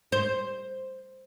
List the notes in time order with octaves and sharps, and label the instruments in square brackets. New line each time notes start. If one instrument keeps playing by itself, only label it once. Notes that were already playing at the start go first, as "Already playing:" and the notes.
[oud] C5